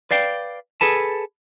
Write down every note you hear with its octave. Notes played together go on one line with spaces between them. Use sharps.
B4 D5 F5 G5
G#4 A4 B4 A5